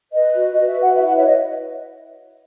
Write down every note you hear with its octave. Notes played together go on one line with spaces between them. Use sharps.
B4 D#5
F#4
F#4 D#5
E5
B4
F#5
E4 E5
F#5
C#5 E5
D#5